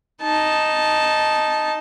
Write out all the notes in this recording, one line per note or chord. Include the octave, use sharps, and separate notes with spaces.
D#4 A5